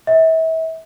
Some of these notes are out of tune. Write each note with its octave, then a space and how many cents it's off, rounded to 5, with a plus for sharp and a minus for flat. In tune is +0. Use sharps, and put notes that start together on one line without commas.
E5 -35